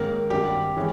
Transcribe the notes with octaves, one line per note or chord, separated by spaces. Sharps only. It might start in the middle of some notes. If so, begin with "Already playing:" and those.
Already playing: G#2 D#3 A#3 C#4 A#4
G#1 G2 G3 G4
E3 G#3 C#4